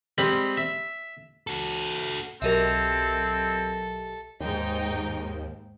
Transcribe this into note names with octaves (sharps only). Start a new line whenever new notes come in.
G3 G#3 C4 B5
E5
F#4 A4
B1 F#3 C4 G4 A4 A#4 D#5 E5
D#2 G#2 D#4 G5